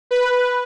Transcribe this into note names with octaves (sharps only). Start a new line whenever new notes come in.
B4